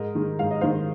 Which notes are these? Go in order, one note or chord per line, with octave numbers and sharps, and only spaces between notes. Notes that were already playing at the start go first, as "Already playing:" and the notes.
Already playing: G#2 A#4 D#5
D#3 G#3
G#2 F5
D#5
D#3 G#3 C5 F5